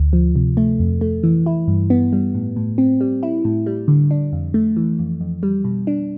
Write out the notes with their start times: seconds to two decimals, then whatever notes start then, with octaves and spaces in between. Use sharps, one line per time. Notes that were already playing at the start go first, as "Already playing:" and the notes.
Already playing: D2
0.13 F3
0.36 C3
0.57 A3
0.80 F2
1.01 A3
1.23 E3
1.46 E4
1.68 G2
1.90 B3
2.13 G3
2.35 A2
2.56 A2
2.78 C4
3.01 G3
3.23 E4
3.45 A2
3.66 G3
3.88 D3
4.11 D4
4.33 F2
4.54 A3
4.76 E3
4.99 F2
5.20 F2
5.43 G3
5.64 B2
5.87 D4